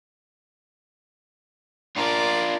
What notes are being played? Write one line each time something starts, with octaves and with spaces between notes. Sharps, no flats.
D4 F4 A#4 D5